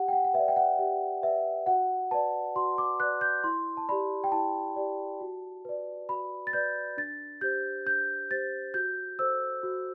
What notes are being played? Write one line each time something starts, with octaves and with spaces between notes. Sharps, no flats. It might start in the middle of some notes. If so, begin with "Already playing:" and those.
Already playing: G4 F#5
G5
F#5
F#5
B4 D5 E5
G5
F#5
G4 E5
B4 D5 E5
F#4 F#5
B4 D5 A5
F#4 C6
D6
B4 D5 F#6
G6
E4 C6
A5
G4 D5 B5
G5
E4 A5
G4 D5
F#4
B4 D5
F#4 B5
A6
B4 D5 G6
D4 A6
G4 C5 G6
D4 G6
G4 C5 A6
F#4 G6
A4 C5 E6
F#4